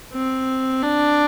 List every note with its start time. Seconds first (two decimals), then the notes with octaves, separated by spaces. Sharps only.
0.13 C4
0.82 D4